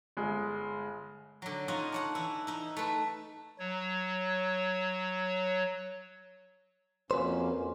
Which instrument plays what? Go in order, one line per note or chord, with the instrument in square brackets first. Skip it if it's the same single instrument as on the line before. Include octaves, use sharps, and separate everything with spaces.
[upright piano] G1 G#3
[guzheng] D3 F#3
C#4 D#4 F4 D#5 F#5 G#5
D4 C#5 F#5
E3 E4
D#4 E4
A3 B4
[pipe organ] F#3 C#5
[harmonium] F2 A#3 C#4 [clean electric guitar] F#4 B4 C5